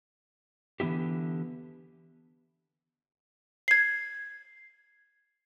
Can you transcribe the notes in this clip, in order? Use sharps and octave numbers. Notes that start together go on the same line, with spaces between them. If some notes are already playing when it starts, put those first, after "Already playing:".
D3 E3 B3 E4 G4
G#6 C7